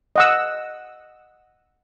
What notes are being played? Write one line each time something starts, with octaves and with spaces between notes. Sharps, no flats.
D#5 F#5 E6